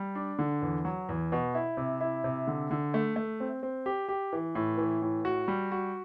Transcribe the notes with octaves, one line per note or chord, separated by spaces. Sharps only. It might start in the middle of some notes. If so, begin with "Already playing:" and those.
Already playing: G3
D4
D3
E2
F#3
E2
B2
E4
C3
E4
C3
D3
D3
A3
A3
C4
C4
G4
G4
E3
A2
E3
A2
F#4
G3
F#4